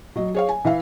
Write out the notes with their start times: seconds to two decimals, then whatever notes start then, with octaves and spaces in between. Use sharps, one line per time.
0.16 F#3 D#5
0.34 G#4 C#5 F5
0.49 G#5
0.65 E3 E5 F5